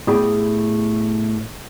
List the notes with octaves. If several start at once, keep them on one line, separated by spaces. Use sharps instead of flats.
A2 B3 G4 G#4 B5